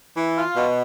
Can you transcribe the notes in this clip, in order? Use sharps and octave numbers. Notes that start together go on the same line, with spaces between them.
E3
F4
B2